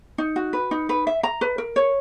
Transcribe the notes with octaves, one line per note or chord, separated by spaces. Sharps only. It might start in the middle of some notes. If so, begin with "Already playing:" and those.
D#4
F#4
B4
D#4
B4
E5
A#5
B4
A#4
C#5